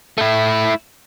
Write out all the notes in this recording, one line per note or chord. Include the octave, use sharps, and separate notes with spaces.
A3 E4